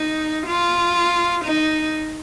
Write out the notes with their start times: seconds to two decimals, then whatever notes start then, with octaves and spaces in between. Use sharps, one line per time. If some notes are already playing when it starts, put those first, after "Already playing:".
Already playing: D#4
0.47 F4
1.44 D#4